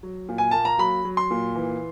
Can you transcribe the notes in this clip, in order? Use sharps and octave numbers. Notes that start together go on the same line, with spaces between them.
F#3
A#2
G#5
A#3 A5
A#5
F#3 B5
F#3
C6
A#2
E3